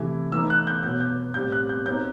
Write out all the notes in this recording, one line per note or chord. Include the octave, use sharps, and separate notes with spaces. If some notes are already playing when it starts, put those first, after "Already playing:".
Already playing: C3 E3 A3 E4
E3 A3 D#4 E6
F#6
G6
B2 F#3 B3 G6
G6
A2 G3 C4 G6
F#6
G6
F#3 C4 D#4 G6